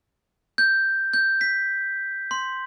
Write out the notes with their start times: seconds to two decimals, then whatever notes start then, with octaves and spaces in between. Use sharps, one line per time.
0.58 G6
1.13 G6
1.41 B6
2.31 C6